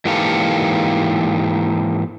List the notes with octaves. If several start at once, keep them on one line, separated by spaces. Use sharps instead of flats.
G#2 E3 A#3 G4 A4 F5